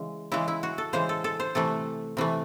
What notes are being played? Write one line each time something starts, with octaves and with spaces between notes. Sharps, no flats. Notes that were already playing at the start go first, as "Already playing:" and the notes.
Already playing: C#3 E3 G#3
C#3 E3 G#3 E4
E4
F#4
A4
C#3 E3 G#3 C5
A4
A4
C5
C3 E3 A3 A4
C3 E3 A3